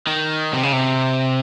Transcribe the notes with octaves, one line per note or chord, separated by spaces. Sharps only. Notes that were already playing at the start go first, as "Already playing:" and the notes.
D#3
C3
C#3
C3